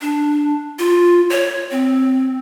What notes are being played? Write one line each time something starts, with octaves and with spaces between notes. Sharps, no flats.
D4
F4
C#5
C4